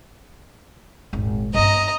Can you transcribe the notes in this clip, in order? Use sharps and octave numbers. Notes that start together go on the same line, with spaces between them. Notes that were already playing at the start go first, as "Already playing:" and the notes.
D#1 G#1
G2 B3 D#5 A#5